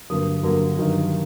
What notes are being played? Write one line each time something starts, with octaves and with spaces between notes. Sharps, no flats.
G2 D3 F#3 A#3 D#6
G2 D3 F#3 A#3
G2 D#3 F#3